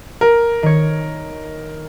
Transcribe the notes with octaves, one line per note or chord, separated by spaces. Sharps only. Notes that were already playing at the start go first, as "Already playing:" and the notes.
A#4
D#3 C#5